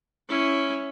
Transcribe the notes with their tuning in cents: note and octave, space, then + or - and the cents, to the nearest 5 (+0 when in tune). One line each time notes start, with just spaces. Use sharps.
C#4 +0 E4 +0